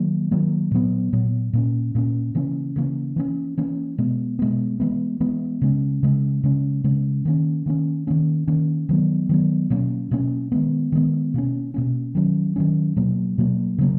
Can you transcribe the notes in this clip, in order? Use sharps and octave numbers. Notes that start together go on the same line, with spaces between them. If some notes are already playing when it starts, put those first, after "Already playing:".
Already playing: D#3 F#3 A#3
D#3 F#3 A#3
A#2 F#3 B3
A#2 F#3 B3
A#2 A#3 C#4
A#2 A#3 C#4
C#3 E3 A#3 C#4
C#3 E3 A#3 C#4
E3 A#3 C#4
E3 A#3 C#4
B2 G#3 B3
B2 G#3 B3
E3 G#3 B3
E3 G#3 B3
C#3 G#3 C#4
C#3 G#3 C#4
C#3 G#3 C#4
C#3 G#3 C#4
D#3 A#3 C#4
D#3 A#3 C#4
D#3 A#3 C#4
D#3 A#3 C#4
D#3 F#3 B3
D#3 F#3 B3
B2 F#3 A#3 C#4
B2 F#3 A#3 C#4
D#3 G#3 B3
D#3 G#3 B3
B2 A#3 C#4
B2 A#3 C#4
D#3 F#3 C#4
D#3 F#3 C#4
B2 F#3 A#3
B2 F#3 A#3
C#3 F#3 A#3